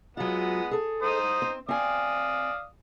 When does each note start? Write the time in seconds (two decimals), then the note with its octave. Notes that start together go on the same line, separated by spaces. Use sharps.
0.17 F#3 G#3 B3 F4 F#5
0.71 G#4 A4
1.02 D#4 C5 D#6
1.42 C4
1.68 C4 D5 F5 G#5 D#6